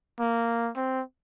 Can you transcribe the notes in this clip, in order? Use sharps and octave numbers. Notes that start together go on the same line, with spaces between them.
A#3
C4